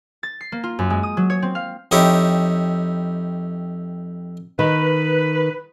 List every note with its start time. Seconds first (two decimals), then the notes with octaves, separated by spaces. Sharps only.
0.23 A6
0.41 C7
0.52 A#3
0.63 F4
0.79 F#2
0.90 G#3
1.03 D#6
1.17 F#3
1.30 C#5
1.42 C4
1.55 F5
1.91 F2 D#4 E4 G4 C#5
4.59 D#3 B4